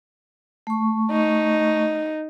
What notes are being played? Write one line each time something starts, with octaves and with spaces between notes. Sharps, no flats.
A3 C#6
D#4